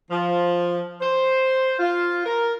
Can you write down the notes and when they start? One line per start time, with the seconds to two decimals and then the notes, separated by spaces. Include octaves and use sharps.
0.11 F3
1.00 C5
1.79 F4
2.26 A#4